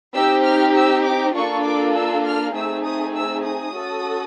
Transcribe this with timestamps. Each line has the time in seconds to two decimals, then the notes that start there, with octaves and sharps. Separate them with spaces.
0.14 C4 D#4 G4 E6
0.44 F6
0.75 E6
1.05 D6
1.35 A#3 D4 F4 A4 C#6
1.64 D6
1.95 E6
2.25 F6
2.54 A3 C4 D#4 G#4 E6
2.85 D#6
3.15 E6
3.44 D#6
3.75 C#4 F#4 A4